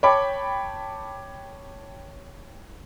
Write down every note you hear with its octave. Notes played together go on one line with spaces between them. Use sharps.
C#5 G5 A5 B5 D6